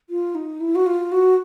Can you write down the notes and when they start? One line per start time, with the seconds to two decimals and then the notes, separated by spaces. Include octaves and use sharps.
0.10 F4
0.35 D#4
0.60 E4
0.75 F#4
0.86 F4
1.12 F#4